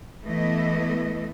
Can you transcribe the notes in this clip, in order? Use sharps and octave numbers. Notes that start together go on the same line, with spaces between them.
E3 A3 B3 E4 D#5